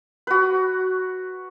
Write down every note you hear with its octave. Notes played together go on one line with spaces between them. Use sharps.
F#4 B4